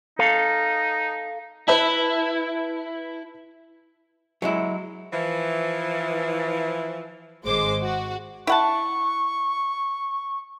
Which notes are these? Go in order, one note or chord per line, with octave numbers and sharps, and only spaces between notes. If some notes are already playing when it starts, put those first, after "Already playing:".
D#4 A4 F5
E4 B4 E5 A5
F#3 G#3 E4
E3 F3
G#1 G#3 C5 D6
F#4
E4 F#5 A5 C#6